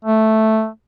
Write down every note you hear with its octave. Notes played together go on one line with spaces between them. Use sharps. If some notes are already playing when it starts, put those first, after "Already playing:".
A3